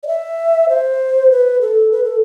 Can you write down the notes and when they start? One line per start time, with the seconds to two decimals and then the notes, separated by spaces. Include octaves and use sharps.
0.03 D5
0.07 E5
0.69 C5
1.31 B4
1.61 A4
1.92 B4
2.04 A4